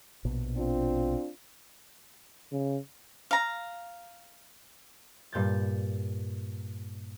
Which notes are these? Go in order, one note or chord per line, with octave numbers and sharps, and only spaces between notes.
A#1 B2
C4 D4 F4
C#3
F5 A#5
G2 A#2 G6 A6